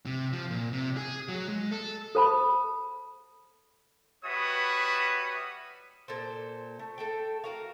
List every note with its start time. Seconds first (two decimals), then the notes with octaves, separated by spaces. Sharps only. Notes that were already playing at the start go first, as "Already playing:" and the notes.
0.06 C3
0.33 F3
0.51 A#2
0.73 C3
0.97 G#4
1.28 F#3
1.49 G#3
1.71 A4
2.15 A4 C5 A5 B5
4.25 G3 F#4 B4 C#5 E5 D#6
6.08 A#2 A4 C5
6.79 A3
6.98 A3 A4 G5
7.44 F#4 A#4 F5